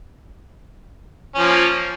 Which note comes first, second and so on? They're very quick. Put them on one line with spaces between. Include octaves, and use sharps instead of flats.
C#4 F3 A#3